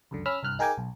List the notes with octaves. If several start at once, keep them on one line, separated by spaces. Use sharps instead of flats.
C#2 F#2 D3
C#4 B5 E6 F6
C2 G2 F6 F#6
D#4 G#4 A#4 G5 G#5 D6
B1